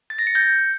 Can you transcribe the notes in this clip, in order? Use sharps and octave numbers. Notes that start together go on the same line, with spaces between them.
A6
A#6
C#7
G6